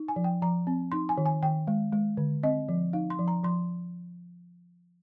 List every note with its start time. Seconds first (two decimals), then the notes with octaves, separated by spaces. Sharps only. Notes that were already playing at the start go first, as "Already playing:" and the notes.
Already playing: D#4
0.08 G#5
0.16 F3
0.24 G5
0.42 F3 A#5
0.67 C4
0.92 D#4 C6
1.09 G#5
1.18 D#3
1.26 G#5
1.43 D#3 G5
1.67 G#3
1.93 G#3
2.17 D3
2.43 C4 D#5
2.69 F3
2.93 D#4 F5
3.10 C6
3.19 F3
3.28 A#5
3.44 F3 C6